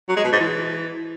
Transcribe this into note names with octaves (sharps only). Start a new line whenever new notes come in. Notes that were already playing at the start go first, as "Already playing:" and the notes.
F#3
G#3
B2
G#2
E3